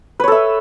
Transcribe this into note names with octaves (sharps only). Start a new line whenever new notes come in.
A4 B4 C#5 E5